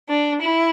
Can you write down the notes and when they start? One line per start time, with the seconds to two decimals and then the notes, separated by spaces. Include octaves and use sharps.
0.09 D4
0.42 E4